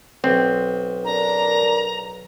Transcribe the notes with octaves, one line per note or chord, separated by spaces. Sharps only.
B1 C4
D4 A#4 A#5